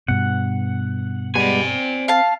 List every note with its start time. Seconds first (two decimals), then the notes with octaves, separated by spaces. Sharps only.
0.08 G2 B2 F#5
1.35 G3 G#3 B3 D5 G#5
1.64 C4
2.08 F5 A5